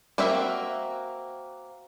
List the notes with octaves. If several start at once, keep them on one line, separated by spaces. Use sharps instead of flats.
A#3 C4 F#4 A#4 E5